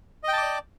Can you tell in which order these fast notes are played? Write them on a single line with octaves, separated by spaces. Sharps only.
D#5 G5 A5 D6 D5